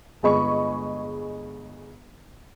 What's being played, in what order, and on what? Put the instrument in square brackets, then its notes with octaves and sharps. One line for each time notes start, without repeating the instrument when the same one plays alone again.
[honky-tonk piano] G1 G#3 G#4 D#5 B5 C#6